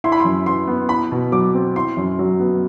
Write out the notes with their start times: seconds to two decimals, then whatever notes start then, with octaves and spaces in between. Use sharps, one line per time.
0.04 E4 C6
0.12 B5
0.20 C6
0.25 F#2
0.46 E3 C6
0.67 B3
0.89 E4 B5
1.12 B2
1.32 F#3 D6
1.54 C4
1.76 E4 C6
1.97 F#2
2.19 F#3
2.40 B3